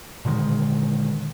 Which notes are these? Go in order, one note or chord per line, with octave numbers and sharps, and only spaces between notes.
A#2 D3 D#3 G#3